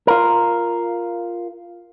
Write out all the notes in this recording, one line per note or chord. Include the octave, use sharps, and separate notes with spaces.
F4 A#4